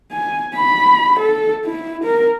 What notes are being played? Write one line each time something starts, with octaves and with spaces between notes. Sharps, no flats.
G#5
B5
A4
E4
A#4